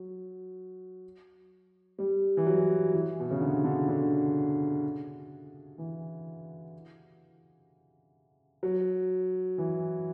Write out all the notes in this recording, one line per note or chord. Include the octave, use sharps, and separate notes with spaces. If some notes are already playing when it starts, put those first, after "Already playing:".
Already playing: F#3
G3
E3
F#3
E3
B2
C#3
D3
D3
D3
E3
F#3
E3